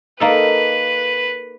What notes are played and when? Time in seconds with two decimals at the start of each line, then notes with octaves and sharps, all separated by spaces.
0.20 A#3 D#4 A4 B4